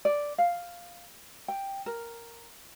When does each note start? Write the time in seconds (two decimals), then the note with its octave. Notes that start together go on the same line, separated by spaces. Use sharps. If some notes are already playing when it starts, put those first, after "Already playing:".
0.05 D5
0.38 F5
1.48 G5
1.86 A#4